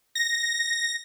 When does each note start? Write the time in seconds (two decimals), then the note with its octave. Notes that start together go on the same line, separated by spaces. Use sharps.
0.15 A#6